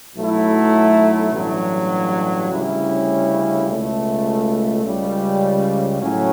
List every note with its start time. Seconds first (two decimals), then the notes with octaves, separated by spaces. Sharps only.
0.16 B1 B2 F#3 A3 E4
1.33 A1 G2 F#3
2.51 D2 C#3 G3 C#4 E4
3.67 C#2 B2 A3
4.85 C#2 C#3 G3
6.02 A2 F#3 C#4